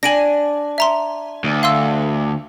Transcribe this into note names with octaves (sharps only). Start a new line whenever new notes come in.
D4 G#5 A#6 D7 F#7
E5 A#5 C6
D2
F5 C6 E6